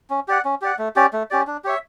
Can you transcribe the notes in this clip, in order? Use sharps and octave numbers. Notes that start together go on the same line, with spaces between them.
C#4
G4 D5 F#5
C#4
G4 D5 F#5
A3
C#4 G4 D5
A3
C#4 G4 D5
D4
G4 C#5 E5